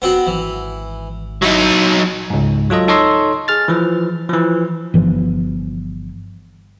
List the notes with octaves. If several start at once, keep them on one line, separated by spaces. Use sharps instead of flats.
E1 B3 C4 F#4
G#1 E3
F#3 D#4 E4
C#2 G#2
F#3 F4 A4 D#5
D#4 A4 C#5 D#5 C6 E6
G#4 F6 A6
E3 F3
E3 F3
G1 E3 F3